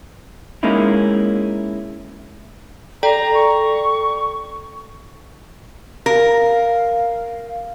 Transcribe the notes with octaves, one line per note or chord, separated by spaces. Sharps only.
G#3 A#3 C#4 D#4 E4
A4 D5 G5 A#5
C#6
A#4 F5